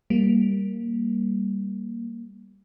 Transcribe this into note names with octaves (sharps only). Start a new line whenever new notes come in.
G3 A#3